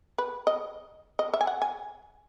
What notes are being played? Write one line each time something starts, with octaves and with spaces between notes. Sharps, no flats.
B4
D#5
D#5
E5
G#5
F#5
G#5